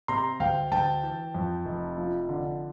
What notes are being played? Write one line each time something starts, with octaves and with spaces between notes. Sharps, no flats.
C3 A#5 C6
D2 F5 G5
D2 G5 A5
E3
F2
F1
F3
D3